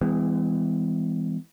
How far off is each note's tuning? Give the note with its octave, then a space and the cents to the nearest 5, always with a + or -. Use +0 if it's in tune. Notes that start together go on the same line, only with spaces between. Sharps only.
E3 +0 G#3 -30 B3 +45